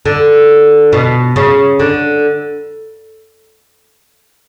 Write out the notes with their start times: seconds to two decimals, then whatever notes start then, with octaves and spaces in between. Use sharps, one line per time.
0.05 D3
0.93 B2
1.36 C#3
1.79 D3